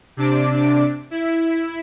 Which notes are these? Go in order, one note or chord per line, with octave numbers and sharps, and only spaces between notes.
C3 D4 D6
E4